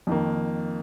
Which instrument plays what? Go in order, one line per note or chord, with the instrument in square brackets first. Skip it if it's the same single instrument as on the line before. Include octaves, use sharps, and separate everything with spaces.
[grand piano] F2 D#3 A#3